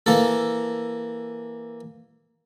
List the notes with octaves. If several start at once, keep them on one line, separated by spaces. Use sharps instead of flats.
E3 A#3 A4